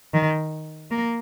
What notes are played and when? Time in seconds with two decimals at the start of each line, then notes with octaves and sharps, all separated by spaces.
0.13 D#3
0.91 A#3